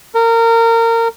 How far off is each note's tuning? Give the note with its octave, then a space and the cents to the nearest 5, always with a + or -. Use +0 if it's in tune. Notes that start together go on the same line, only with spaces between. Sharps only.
A#4 -25